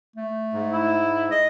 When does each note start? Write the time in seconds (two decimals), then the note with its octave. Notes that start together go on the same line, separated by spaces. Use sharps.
0.16 A3
0.53 G#2
0.72 E4
1.31 D#5